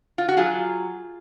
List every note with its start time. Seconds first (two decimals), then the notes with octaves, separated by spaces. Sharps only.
0.18 F4
0.29 F#4
0.37 F#3 F4 G#4